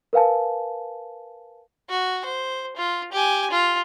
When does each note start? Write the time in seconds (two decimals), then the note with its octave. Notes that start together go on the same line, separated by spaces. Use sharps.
0.13 A#4 B4 F5 G#5 A5
1.89 F#4
2.25 C5
2.76 F4
3.12 G4 G#5
3.51 F4